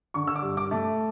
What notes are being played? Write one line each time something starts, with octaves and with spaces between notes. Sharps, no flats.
D3 C#6
E6
D6
G2
D6
A3